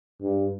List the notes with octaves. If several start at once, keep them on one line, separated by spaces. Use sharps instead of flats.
G2